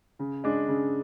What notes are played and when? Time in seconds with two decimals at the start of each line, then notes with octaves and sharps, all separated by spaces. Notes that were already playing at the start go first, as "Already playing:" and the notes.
0.19 C#3
0.44 G#3 D4
0.68 C#3